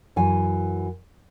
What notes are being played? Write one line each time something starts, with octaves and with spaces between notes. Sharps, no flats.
F#2 E3 G#5